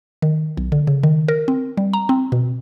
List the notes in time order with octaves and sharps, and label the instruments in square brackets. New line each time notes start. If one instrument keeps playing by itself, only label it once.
[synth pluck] D#3
B1
D3
C#3
D#3
A#4
C4
G3
A#5
C4
B2